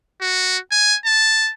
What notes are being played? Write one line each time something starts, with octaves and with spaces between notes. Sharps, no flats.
F#4
G#5
A5